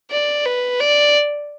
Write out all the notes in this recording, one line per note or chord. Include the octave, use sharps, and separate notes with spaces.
D5
B4
D5